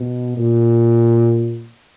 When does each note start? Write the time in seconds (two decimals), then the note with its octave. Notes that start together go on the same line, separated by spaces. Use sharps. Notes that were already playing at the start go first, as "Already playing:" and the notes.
Already playing: B2
0.37 A#2